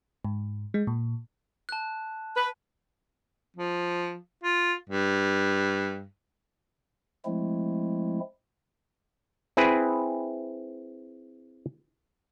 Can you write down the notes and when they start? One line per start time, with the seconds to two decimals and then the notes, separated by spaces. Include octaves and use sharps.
0.25 G#2
0.74 G#3
0.87 A#2
1.69 A5 F#6
2.36 B4
3.57 F3
4.44 F4
4.90 G2
7.25 F3 G#3 A3 C4 E4
9.57 C4 E4 G#4 B4